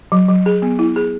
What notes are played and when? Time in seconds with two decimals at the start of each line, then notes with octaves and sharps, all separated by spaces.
0.12 F#3
0.29 F#3
0.46 G#4
0.62 B3
0.79 E4
0.96 G#4